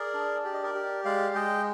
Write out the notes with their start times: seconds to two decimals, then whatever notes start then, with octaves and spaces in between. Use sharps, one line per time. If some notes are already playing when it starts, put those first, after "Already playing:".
Already playing: G#4 A#4 D5
0.14 D4
0.44 G4 D5
0.53 D#5
0.63 A#4 D5
0.75 G4
1.05 G#3 D5 F5
1.35 G#3 D#5 G5